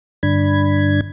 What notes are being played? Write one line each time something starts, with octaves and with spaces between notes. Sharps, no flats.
G2 D3 D4 B5 G#6